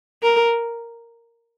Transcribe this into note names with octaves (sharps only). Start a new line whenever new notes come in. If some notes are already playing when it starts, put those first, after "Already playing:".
A#4